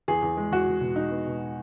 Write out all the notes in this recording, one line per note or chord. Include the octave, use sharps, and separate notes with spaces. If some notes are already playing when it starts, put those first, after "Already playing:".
E2 G#4
E2
G#3
E2 F#4
E2
B2
G#3 D#4
B3
B2